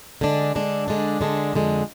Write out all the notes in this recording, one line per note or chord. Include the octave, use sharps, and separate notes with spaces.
D3 G#3 D4
D3 G#3 D4
D3 G#3 D4
D3 G#3 D4
F2 D3 G#3